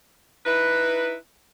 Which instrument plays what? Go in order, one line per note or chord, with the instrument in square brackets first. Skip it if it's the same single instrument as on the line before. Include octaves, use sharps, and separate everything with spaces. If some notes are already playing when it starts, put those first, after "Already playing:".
[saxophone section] D#4 E4 B4